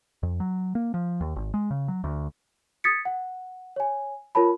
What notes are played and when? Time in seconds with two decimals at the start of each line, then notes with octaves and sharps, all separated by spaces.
0.23 F2
0.40 F#3
0.75 A#3
0.94 F3
1.21 D#2
1.36 G#1
1.54 G#3
1.71 C#3
1.88 F#3
2.04 D2
2.84 D#6 G#6 A6 B6 C#7
3.05 F#5
3.76 C#5 G#5
4.35 F4 A#4 C#5 A5 B5